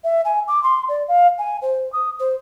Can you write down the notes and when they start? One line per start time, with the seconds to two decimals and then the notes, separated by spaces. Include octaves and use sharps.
0.04 E5
0.25 G#5
0.48 D6
0.63 C6
0.88 D5
1.08 F5
1.38 G#5
1.61 C5
1.92 D#6
2.19 C5